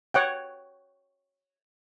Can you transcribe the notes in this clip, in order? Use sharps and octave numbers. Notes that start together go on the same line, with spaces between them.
C#5 F#5 G5